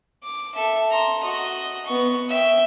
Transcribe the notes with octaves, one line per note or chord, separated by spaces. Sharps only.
D6
A4 E5
A#5 C6
F#4 D#5
B3 C#6
E5 G5